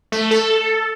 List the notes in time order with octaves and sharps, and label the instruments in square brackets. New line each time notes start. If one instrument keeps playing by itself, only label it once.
[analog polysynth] A3
A4